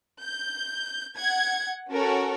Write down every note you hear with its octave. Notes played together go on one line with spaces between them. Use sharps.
G6
F#5 G#6
C#4 F#4 A4 A#4